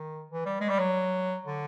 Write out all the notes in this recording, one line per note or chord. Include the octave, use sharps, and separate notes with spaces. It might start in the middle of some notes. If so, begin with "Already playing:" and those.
Already playing: D#3
E3
G3
G#3
G3
F#3
D3